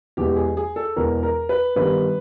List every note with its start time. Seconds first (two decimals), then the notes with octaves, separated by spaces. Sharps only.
0.17 E2 B2 G#3 G4
0.36 G#4
0.57 G#4
0.76 A4
0.96 E2 B2 G#3 A#4
1.23 A#4
1.49 B4
1.76 G2 D#3 G3 B3 B4